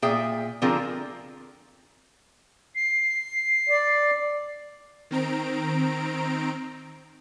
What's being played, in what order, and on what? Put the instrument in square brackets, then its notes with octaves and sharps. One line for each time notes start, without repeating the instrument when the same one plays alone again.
[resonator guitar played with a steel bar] A#2 G#4 E5 G5
D3 F3 C4 F4 G#4 A#4
[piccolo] C7
[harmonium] D5
[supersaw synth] D#3 C4 A#5 D7